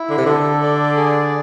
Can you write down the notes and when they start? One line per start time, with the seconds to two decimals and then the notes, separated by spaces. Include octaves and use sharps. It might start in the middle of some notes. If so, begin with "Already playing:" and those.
Already playing: E4
0.10 D3
0.18 C3
0.26 D3 A4
0.62 D5
0.96 G#4